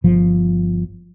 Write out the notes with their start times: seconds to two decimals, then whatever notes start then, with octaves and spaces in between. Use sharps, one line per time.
0.04 G1 F3